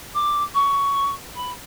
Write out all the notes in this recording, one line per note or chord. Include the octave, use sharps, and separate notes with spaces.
D6
C#6
B5